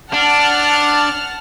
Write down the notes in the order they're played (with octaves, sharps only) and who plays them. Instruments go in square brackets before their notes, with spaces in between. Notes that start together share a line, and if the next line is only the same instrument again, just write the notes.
[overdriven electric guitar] D4 [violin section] F#5 A5 F6